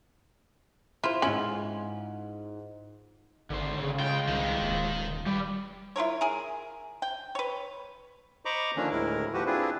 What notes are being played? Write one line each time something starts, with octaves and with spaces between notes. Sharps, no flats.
E4 F4 C5
G#2 C#4 E4 F4 F#7
G#1 D3 C5
C#3
G#3 F4 G5
C2 D#3
D#1
G3 G4 B4 D5
E4 F4 A#4 C#5
G#4 A#4
G5
B4 C#5
C5 D#5 A#5 B5 C#6 D6
D3 D#3 F3 A#3 C#4 D4
D2 A2 G#3 E4 A#4
D#2 F3 F#4 G4 B4
C4 D4 E4 F4 G#4 B4